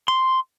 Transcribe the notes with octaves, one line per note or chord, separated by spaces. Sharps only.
C6